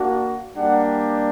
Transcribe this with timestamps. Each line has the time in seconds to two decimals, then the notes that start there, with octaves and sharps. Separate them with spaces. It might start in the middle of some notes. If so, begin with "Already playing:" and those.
Already playing: A#3 D4 F#4
0.56 G3 A#3 D4 G4 F#5